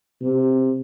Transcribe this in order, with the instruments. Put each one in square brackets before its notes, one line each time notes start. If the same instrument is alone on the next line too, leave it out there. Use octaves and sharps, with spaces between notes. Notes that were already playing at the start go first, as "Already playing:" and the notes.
[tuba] C3